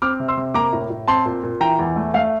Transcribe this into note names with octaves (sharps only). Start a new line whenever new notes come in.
C4 D6 F6
C3
C6 E6
C3
A#3 A#5 D6
A2
A2
C4 A5 C6
A#2
A#2
E3 G5 A#5
E2
A3
A3 F5